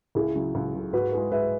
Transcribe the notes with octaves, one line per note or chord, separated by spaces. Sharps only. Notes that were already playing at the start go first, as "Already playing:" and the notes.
C#2 E4 G#4
C#3 F#3
C#2
C#3 F#3
G#2 F#4 B4
G#3 E4 G#4 B4
G#2 B4 E5